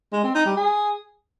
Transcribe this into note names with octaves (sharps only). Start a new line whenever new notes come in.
G#3
C4
D#4
G3
G#4